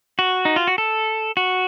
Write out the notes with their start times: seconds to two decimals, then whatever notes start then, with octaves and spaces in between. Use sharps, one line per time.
0.19 F#4
0.45 D#4
0.56 F4
0.67 F#4
0.78 A4
1.37 F#4